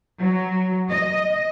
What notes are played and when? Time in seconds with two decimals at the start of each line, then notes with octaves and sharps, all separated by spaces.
0.19 F#3
0.90 D#5